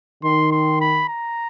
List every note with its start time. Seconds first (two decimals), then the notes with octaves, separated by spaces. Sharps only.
0.24 D#3 C6
0.52 C6
0.81 B5
1.09 A#5